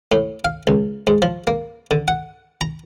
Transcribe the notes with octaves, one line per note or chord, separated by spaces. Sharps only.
A2
F5
C#2
G#2
F3
A#3
D3
F#5
A#5